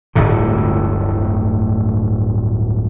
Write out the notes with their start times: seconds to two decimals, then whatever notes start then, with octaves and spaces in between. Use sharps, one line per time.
0.15 D1 G1 A2 D3